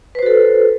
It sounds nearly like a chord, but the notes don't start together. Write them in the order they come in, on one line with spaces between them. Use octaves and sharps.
B4 C5 F#4 A4